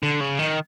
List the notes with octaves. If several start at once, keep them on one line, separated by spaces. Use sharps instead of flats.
D3
C#3
D#3